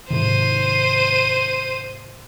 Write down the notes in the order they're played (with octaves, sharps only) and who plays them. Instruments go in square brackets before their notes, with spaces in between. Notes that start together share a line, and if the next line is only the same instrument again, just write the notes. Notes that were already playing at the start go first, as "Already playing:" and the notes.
[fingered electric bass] G#2 C3 D#3 [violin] C5 D#7